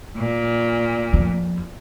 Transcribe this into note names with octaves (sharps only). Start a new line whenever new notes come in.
A#2
F2